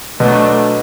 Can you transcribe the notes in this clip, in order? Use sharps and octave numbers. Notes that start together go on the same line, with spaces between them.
B2 F#3 A3 D4